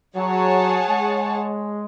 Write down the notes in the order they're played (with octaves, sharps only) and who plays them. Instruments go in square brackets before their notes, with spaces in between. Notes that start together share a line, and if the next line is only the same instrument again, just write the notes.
[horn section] F#3 [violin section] G#4 C#5 F#5 A5
[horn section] G#3